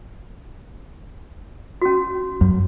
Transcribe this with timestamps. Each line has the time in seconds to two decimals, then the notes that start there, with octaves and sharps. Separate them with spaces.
1.81 C#4 F#4
2.41 F#2